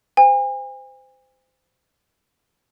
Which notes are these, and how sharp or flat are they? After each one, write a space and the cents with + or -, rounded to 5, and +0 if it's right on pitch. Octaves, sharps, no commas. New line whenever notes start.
C5 -25 G#5 -45